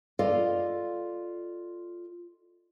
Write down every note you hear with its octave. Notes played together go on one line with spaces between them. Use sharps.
F4 A4 D5 D#5 F5